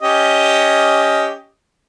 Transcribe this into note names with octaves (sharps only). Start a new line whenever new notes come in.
C#4 G4 D#5